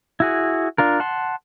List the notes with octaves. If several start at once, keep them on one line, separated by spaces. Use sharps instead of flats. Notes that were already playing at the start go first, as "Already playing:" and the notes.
E4 F#4 G#4
D4 F4 A#4
F#5 A5 C6